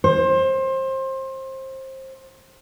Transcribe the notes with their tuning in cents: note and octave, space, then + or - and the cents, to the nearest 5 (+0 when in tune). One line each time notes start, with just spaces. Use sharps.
C5 +25